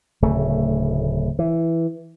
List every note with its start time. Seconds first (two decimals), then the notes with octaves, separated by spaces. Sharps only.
0.22 D1 C#3 A3
1.39 E3